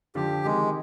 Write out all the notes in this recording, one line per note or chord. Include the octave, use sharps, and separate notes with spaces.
D3 F3 G4
C3 D#3 G#3